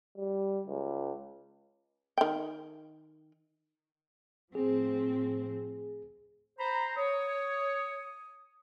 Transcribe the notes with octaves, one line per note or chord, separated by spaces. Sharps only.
G3
C#2
D#3 G5
A2 F3 C4 G#4
C5 A#5 B5
C#5 D#6